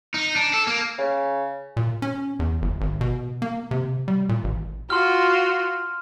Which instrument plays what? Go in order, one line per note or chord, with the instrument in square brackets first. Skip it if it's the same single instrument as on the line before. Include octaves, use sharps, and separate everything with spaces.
[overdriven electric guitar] D#4
D4
A4
A#3
[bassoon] C#3
[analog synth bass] A#2
C#4
E2
G1
G#1
B2
A#3
C3
G3
A#2
A1
[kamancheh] F4 F#4 [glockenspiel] C6 F6